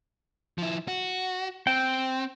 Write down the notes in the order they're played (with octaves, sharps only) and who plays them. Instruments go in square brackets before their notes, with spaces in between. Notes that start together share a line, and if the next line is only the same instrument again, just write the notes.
[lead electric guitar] F3 E4
F#4
[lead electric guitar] C4 [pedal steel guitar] G5